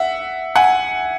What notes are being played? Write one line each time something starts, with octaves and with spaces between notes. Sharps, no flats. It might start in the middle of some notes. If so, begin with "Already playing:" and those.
Already playing: E5 F#5
F#5 G#5